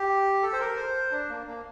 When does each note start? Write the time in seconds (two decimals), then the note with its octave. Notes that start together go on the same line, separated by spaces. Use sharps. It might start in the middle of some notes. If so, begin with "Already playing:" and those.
Already playing: G4
0.42 A4
0.53 C5
0.60 A#4
0.77 C5
1.12 D4
1.29 A#3
1.47 A#3